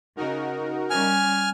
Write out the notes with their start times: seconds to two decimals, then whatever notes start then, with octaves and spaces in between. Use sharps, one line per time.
0.16 C#3 D#4 F#4 A#4
0.90 G3 C#4 G#5 F6